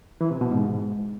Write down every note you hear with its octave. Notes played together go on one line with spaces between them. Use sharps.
E3
C3
B2
G#2